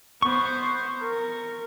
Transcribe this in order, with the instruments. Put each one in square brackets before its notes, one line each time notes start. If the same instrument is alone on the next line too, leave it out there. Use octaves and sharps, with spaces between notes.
[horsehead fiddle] B3 C5 [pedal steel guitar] C#6
[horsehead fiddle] A#4